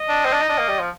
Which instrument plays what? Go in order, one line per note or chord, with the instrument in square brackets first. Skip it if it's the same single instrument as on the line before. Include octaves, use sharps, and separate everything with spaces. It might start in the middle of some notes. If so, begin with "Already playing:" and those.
Already playing: [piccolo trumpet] D#5
[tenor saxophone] D4
C4
D4
D#4
D4
A#3
G3
F3